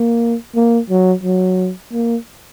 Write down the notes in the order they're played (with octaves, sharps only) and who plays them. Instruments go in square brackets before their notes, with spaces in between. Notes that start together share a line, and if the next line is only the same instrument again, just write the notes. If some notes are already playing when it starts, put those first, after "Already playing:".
Already playing: [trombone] A#3
A#3
F#3
F#3
A#3